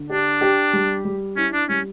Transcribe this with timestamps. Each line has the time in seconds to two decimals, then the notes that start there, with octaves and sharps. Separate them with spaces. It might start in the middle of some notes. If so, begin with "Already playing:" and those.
Already playing: D3
0.10 D4 G4
0.41 G4
0.73 G3
1.05 G3
1.37 C#4 E4
1.53 D4
1.69 G3 C#4